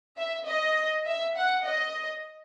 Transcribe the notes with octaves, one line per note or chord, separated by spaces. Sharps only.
E5
D#5
E5
F#5
D#5